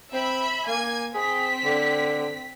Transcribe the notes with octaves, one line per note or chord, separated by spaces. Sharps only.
C4 E5 B5
A#3 G#5 G#6
C4 G#4 B6
D3